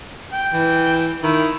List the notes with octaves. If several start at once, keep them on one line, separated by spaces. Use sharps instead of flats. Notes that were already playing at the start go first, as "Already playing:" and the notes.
G5
E3
D#3 E4